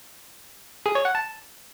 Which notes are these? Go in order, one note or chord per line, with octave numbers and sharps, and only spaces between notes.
G#4
C#5
F#5
A5